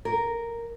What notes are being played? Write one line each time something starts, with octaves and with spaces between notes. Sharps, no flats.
A#4